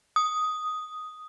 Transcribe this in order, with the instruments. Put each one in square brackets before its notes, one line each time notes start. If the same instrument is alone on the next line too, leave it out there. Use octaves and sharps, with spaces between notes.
[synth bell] D#6